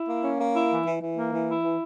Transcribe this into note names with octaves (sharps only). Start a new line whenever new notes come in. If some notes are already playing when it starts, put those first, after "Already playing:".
Already playing: E4
A#3
C#4
A#3
E4
E3
E3
E3
A#3
E3
E4
E3